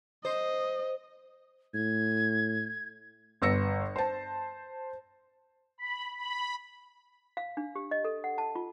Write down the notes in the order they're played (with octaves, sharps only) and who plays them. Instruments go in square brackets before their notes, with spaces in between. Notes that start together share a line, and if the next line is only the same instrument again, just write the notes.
[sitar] C5 [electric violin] D#5
[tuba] A2 [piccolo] G#6
[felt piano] G1 B3 E6 A#6 C#7
C5 A5
[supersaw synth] B5
B5
[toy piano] F5
D4
G4
D#5
A4
F#5
A5
F4